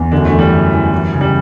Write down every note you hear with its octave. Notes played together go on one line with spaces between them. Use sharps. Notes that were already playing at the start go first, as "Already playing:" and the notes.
Already playing: E2
F#2 D3 D4
A3
E3
G3
F#2
E3
E3
C#3
G3